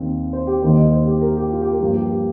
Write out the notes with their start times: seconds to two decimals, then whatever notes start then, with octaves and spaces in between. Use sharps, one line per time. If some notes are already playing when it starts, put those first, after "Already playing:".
Already playing: D#2 D#3 C4
0.33 C5
0.47 G4
0.62 D#2 D#3 A#3 C5
0.77 D#5
0.92 C5
1.07 G4
1.21 A#4
1.37 G4
1.52 F4
1.61 G4
1.72 A#4
1.81 G2 F3 A#3 G4
1.96 G4
2.11 G4